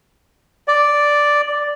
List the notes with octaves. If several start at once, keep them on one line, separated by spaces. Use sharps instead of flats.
D5